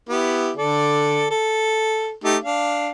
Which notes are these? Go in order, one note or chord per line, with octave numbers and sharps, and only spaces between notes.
B3 E4 G4
D3 A4 D5
A4
A3 D#4 G4
D4 F5